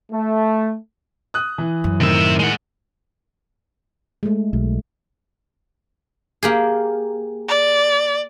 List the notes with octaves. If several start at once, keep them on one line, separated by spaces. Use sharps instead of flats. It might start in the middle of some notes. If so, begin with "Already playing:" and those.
A3
D#6 F#6
E3
F#2
A2 C3 D#3 E5
G#3 F#5
G#3 A3
B1
A#3 G4 G#4
D5